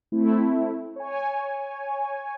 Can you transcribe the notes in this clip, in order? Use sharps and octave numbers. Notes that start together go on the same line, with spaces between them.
A3 C4 E4
C#5 G#5